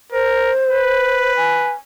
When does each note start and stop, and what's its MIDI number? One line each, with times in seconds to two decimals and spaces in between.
0.13 0.52 70
0.13 1.35 72
0.69 1.74 71
1.37 1.72 80